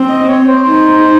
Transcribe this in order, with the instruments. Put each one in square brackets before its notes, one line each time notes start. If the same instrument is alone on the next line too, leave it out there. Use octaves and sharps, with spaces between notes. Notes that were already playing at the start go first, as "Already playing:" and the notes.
Already playing: [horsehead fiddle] C4
[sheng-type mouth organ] D#5
C#5
C5
[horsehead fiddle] D#4